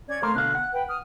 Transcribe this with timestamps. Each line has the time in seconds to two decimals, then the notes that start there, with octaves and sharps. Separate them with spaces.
0.08 C#4 D5 G#6
0.22 A3 A#4 C5 F5 D6 F6
0.34 B2 D3 F5 F#6
0.55 F#5
0.73 B4 G5
0.88 D#6 F6